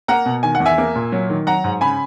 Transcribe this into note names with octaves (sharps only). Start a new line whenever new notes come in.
A#3 F#5 A#5
B2
D#3 G#5
F#5
E2
E5 G#5
A#3
A#2
F#3
D#3
F#3 F#5 A#5
G#2
C#3 G#5 B5